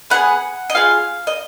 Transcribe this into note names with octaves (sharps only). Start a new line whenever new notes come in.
B3 F4 G#4 F#5
D#5
B3 F4 G#4 F5
D#5